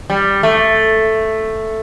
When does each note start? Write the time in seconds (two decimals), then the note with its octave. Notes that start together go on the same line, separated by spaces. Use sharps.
0.10 G3
0.43 A3